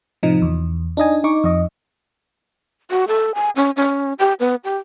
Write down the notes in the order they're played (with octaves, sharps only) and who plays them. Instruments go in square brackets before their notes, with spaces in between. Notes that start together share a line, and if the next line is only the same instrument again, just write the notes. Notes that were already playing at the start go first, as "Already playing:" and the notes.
[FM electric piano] A2 C3 F3 D#4
E2
D4 D#4 D#5 G#5
D#4 C#6 D6
F2 D#5
[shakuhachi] F#4
A4
G#5
C#4
C#4
G4
B3
G4